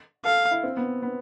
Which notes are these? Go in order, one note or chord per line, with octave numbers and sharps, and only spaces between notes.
A4 F5
E4
C4
B3
B3